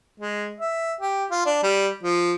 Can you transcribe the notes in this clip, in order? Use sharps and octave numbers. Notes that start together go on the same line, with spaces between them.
G#3
E5
G4
F4
D4
G3
F3